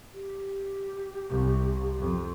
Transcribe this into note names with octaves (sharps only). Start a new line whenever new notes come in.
G4
C2
F2